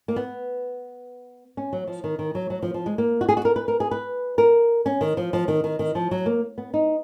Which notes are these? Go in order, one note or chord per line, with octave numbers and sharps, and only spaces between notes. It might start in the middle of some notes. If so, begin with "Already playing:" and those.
A#3
B3
C#4
F#3
F3
D#3
D#3
F#3
F#3
F3
F3
G#3
A#3
F#4
G#4
F#4
A#4
B4
A#4
G#4
B4
A#4
C#4
D#3
F3
F3
D#3
D#3
D#3
F3
F#3
A#3
B3
D#4